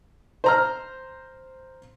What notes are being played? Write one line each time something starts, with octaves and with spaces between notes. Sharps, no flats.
C5 A#5 F6